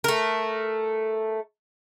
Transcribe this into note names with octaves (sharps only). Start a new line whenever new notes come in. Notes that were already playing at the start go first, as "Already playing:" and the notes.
A3 A#4